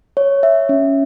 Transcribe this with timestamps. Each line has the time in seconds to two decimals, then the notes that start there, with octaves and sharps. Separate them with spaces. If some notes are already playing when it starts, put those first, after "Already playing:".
0.17 C#5
0.43 E5
0.69 C#4